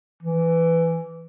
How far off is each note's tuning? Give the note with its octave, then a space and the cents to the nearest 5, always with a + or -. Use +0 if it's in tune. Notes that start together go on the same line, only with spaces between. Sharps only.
E3 +10